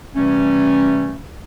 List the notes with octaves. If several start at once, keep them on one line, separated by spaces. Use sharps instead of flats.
C3 E3 G3 A3 C#4